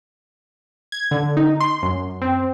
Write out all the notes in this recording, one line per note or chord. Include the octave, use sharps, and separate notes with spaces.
G#6
D3
D#4
C6
F#2
C4